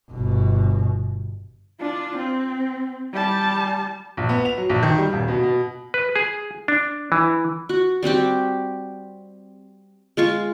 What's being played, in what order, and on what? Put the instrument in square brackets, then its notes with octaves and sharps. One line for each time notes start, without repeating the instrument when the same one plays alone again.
[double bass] G1 B2
[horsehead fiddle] D4 F4
C4
G3 A5
[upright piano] A#1
B3
F7
F#3
A#1
D#3
G3
D#1
B2
B2
[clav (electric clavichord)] B4
G#4
D4
E3
[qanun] F#4
G3 C4 F#4 G4
G#3 F4 C#6